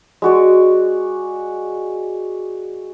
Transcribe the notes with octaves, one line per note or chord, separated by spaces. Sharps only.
G#3 F#4 D5